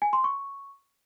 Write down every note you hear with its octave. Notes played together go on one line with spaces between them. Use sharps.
G#5
C6
C#6